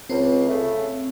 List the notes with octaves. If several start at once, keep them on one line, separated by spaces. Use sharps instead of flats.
C#2 C4
C#3 A3